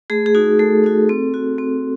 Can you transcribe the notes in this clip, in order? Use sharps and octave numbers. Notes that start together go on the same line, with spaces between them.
A3 G#4
G#4
D#4 F#4
A3 A4
D#4 F#4
C4
F#4
C4